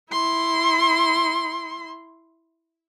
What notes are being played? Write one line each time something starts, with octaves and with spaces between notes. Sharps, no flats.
E4 C6